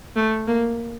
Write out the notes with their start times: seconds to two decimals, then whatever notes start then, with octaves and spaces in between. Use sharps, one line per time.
0.16 A3
0.47 A#3